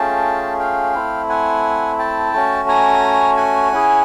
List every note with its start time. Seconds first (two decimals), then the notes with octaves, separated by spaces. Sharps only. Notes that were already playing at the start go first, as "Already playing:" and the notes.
Already playing: A3 C#4 F4 G#4 G5 A5
0.60 F5 G5
0.95 A3 C4 E4
1.30 F#5 G#5
1.99 G5 A5
2.34 A3 C#4 F#4
2.69 G#5 A#5
3.37 F#5 G#5
3.72 C#4 E4 G#4